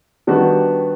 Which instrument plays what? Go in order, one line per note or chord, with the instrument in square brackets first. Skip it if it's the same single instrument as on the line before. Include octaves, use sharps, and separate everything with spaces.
[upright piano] D#3 G3 B3 D4 F#4